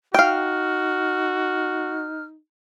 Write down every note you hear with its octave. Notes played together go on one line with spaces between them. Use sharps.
D#4 F#4 F5 G5 F6